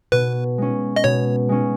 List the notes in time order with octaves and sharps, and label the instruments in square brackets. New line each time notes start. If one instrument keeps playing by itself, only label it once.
[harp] B2 [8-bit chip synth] B4
[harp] G#3 C#4
[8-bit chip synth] D#5
[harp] B2 [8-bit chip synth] C#5
[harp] G#3 C#4